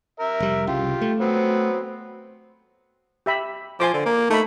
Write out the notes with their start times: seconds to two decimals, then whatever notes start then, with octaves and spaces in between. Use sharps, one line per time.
0.20 A#4 E5
0.40 F1 G3
0.67 C2 C#3 F4 G4
1.01 A3
1.20 F#3 B3 C4
3.26 G4 E5 B5
3.80 F3 G#5 C6 D6
3.94 D3
4.06 A#3
4.30 A3 D#4 B5